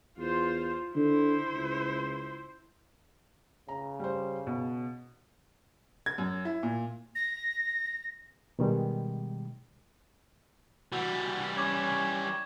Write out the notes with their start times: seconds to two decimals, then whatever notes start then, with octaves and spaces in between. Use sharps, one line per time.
0.18 E2 F4 C5
0.96 D3 E4 C5
1.54 C#2
3.69 C#3 A#5
4.00 G3 C5
4.47 B2
6.06 G#6
6.18 F#2
6.45 E4
6.63 A#2
7.15 A#6
8.59 B2 D#3 G3 G#3
10.92 E3 G3 F#4
11.57 C#4 C#6 D6 G#6